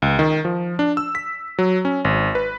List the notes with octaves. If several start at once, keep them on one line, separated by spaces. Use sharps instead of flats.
C#2
D#3
F3
D4
E6
B6
F#3
C#4
G#1
B4